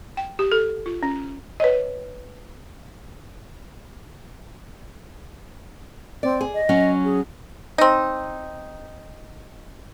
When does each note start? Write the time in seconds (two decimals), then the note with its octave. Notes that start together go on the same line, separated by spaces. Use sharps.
0.17 G5
0.39 G4
0.52 A4
0.86 F4
1.03 C#4
1.60 B4 C#5 D#5
6.23 C4 D5
6.41 G#4
6.54 D#5
6.69 F#3 C#4
7.04 G#4
7.78 C4 D#4